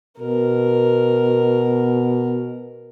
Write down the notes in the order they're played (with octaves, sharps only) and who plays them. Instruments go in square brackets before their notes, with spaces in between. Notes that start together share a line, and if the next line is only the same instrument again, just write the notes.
[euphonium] B2 [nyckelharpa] A#4